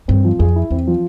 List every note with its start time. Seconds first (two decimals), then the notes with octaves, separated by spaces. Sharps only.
0.08 G2 C4
0.25 F3
0.39 F2 G#4
0.56 E4
0.71 E2 C4
0.87 F3